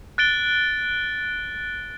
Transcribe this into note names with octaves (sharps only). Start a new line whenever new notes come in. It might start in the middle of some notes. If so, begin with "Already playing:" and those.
F#6 A6 D7 G7